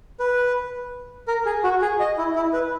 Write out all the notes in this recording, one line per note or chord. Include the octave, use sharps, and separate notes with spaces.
B4
A#4
G#4
F#4
G#4
D#5
E4
E4
B4